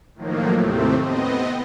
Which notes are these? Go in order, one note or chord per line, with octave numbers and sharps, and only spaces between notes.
A2 D#3 F3 F#3 A#3
D#2 A2 C3 A3 C4
B3 C4 D#5